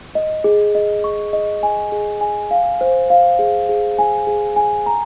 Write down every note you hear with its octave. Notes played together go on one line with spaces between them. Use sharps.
D#5
G#4
D#5
C#6
D#5
G#5
G#4
G#5
F5
C5
F5
G#4
G#4
G#5
G#4
G#5
A#5